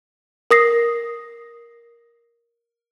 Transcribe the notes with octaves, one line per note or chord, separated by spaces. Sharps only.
A#4 D#6 A#6 C7